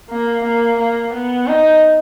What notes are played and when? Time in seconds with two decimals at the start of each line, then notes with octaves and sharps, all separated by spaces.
0.10 A#3
0.44 A#3
0.79 A#3
1.13 B3
1.47 D#4